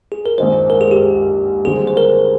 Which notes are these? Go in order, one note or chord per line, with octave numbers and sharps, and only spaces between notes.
G#4
A#4
A#1 G#2 D#3 G#3 C5
A#4
G#4
G4
D#2 D3 G3 C4 G#4
C5
A#4